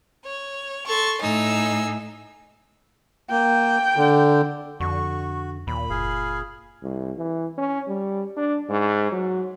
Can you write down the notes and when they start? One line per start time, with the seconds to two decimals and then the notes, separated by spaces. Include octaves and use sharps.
0.24 C#5
0.86 A4 C6 C#6 A6
1.21 A2 D#4 G#5 E6
3.30 A#3 G5
3.96 D3
4.80 F2 D3 F#4 C#6
5.67 D#2 A#2 B5
5.90 F#1 G#4 F5
6.83 C2
7.17 E3
7.58 C#4
7.87 G3
8.37 D4
8.70 G#2
9.12 F#3